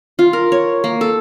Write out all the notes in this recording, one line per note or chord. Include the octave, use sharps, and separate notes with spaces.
F4
A#4
C#5
A#3
A4